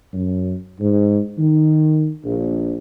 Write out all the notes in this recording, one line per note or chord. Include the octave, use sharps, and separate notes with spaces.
F#2
G#2
D#3
A#1